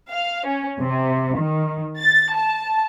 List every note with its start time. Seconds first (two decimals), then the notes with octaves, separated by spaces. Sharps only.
0.11 F5
0.46 C#4
0.80 C3
1.37 D#3
1.98 A6
2.35 A5